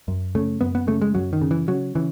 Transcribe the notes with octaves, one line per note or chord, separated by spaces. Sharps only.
F#2
C#3 A3
F#2 B3
B3
C#3 A3
G#3
F#2 F#3
D#3
C#3
E3
C#3 F#3
C#3 E3